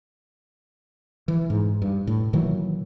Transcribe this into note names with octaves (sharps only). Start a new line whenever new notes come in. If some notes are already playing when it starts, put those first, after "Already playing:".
E3
G#2
G2
A2
A#2 D#3 E3 F#3